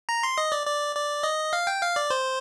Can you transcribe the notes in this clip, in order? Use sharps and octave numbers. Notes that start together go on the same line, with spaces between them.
A#5
C6
D#5
D5
D5
D5
D#5
F5
G5
F5
D5
C5